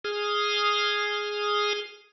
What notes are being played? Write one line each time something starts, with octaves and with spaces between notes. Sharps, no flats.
G#4 D#6 F6